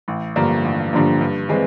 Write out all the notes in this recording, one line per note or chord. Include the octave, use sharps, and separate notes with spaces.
A1
G2 D3 F3 A#3
A1
G2 D3 F3 A#3
G2
E3 G#3 C4